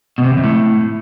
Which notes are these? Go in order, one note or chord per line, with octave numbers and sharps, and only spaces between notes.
B2
C3
E2
F2
A2